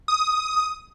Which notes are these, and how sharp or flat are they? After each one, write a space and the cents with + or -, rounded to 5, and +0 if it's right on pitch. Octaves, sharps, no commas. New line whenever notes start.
D#6 +10